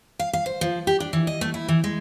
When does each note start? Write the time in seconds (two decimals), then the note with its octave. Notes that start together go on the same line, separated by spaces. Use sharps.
0.19 F5
0.33 F5
0.46 C5
0.61 F3
0.87 G4
1.00 D4
1.13 E3
1.27 D#5
1.41 A3
1.54 E4
1.68 E3
1.84 G#3